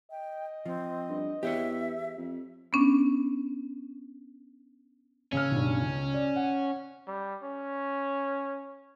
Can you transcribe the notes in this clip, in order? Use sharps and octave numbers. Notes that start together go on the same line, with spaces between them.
D#5 G5
F3 C4
G2
E2 G4 C5 C#5 E5
F2
B3 C#4 D4
C#3 C#4 E6 F6
B1 G2
C#2
D5
F#5
G3
C#4